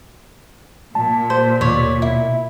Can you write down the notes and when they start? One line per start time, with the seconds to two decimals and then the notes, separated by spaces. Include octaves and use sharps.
0.95 A#2 A5
1.30 C5
1.61 D#2 B2 C#5 D5
2.02 B2 E4